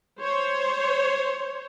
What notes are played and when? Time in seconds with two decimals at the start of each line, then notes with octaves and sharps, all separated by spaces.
0.21 C5 C#5